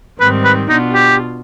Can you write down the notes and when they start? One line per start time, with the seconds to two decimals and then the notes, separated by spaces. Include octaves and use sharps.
0.19 G#2 D#3 G3 C4 B4
0.44 B4
0.69 B2 B3 D4 D#4 F4
0.93 G4